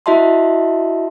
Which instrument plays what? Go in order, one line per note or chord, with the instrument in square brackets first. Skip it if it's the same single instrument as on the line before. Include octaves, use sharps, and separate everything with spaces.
[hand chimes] E4 F#4 D#5 E5 A5 C6